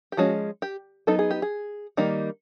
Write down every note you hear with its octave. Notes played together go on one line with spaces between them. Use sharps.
G4
F3 G#3 C#4 F#4
G4
F#3 B3 D#4 A4
G#4
G4
G#4
D#3 G3 A#3 D#4